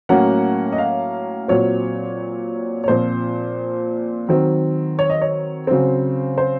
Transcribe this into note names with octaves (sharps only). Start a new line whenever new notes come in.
A2 F#3 A#3 C#4 F#5
D#5
F5
A#2 F#3 C4 C#5
C#5
A#2 F3 C4 C5
D#3 F#3 C4
C#5
D#5
C#5
C#3 F#3 C4 C5
C5